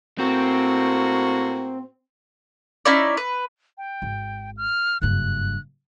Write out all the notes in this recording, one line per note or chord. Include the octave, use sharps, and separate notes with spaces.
A2 A#3 C4 F#4
C#4 D#4 E4 D5
B4
G5
G#1
F6
F#1 G2 F#6